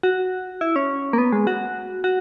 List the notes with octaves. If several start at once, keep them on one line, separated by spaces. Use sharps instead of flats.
F#4
E4
C#4
A#3
B3
G#3
F#4
F#4